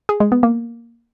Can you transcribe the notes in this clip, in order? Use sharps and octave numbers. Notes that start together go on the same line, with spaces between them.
G#4
G#3
B3
A#3